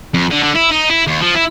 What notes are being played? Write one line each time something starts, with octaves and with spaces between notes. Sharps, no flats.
F2
D3
D3
E4
D#4
E4
D#2
F3
E4